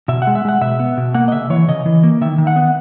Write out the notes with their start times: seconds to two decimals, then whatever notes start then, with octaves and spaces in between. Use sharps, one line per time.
0.08 B2 E5
0.22 F#5
0.27 G#3
0.35 E5
0.45 G#3 F#5
0.61 B2 E5
0.80 B3
0.97 B2
1.14 A#3 F#5
1.28 D#5
1.32 C#3 E5
1.50 E3 C#5
1.68 C#3 D#5
1.86 E3
2.04 A#3
2.21 D#3 E5
2.38 D#3
2.47 F#5
2.56 B3